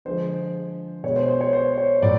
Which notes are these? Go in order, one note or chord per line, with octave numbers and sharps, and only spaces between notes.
D3 F3 G#3 C5
B2 G#3 C#5
C5
C5
C#5
C5
C#5
A2 F#3 A3 D5